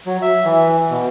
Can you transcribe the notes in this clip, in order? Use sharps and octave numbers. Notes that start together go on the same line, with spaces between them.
F#3
E5
E3
B2